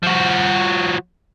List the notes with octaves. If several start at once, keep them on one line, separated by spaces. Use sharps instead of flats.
F3 F#4